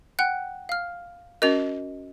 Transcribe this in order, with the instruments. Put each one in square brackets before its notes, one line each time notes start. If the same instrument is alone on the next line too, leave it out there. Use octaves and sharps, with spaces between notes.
[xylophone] F#5 G5 F#6
F5 F6
[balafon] C#4 F#4 A#4 [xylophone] D#5 F7